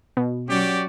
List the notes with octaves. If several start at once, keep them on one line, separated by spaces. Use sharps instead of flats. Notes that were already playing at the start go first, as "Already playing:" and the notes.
B2
F#3 C#4 F#4 G4 D5